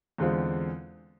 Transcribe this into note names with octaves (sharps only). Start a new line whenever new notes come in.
E2 D3 G#3 C4 F4